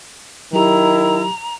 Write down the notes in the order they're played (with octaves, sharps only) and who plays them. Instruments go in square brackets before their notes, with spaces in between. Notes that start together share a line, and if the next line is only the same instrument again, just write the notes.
[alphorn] D#3 [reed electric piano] F#3 G4 [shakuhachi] E4 [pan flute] A#5